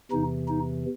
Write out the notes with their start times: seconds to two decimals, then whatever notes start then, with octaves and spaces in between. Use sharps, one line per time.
0.12 E2 C3 E3 D#4
0.49 D#4